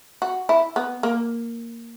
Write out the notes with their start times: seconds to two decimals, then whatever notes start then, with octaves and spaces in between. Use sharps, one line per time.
0.22 F#4
0.49 E4
0.76 B3
1.03 A#3